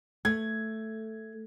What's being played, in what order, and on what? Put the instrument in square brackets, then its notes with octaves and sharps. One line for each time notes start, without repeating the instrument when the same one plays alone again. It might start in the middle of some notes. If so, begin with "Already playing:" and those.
[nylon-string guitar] A3 [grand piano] G#6